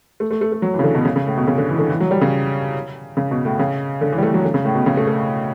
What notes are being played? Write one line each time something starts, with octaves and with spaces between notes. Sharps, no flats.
A3
A3
A3
A3
F#3
E3
C#3
D3
B2
C#3
C#3
A2
B2
C#3
D3
E3
D3
E3
F#3
G3
C#3
C#3
B2
A2
C#3
D3
E3
G3
A3
F#3
D3
C#3
A2
B2
C#3
A3
A3